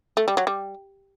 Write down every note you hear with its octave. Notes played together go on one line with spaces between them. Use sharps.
A3
G3
F#3
G3